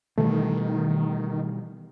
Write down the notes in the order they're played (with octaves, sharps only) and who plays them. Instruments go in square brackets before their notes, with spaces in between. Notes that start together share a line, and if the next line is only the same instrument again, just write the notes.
[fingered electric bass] B2 E3 G3 [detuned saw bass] D#3 [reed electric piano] A3